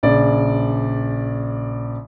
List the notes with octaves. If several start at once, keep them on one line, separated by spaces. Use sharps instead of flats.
A#1 C#3 D5